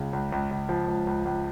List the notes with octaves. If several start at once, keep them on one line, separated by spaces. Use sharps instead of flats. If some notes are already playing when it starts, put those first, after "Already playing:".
Already playing: C#2 C#3
C#2
C#2
C#2
F3
C#2
C#2
C#2